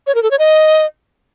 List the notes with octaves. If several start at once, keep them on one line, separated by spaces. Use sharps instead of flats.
C#5
A#4
A4
C#5
D#5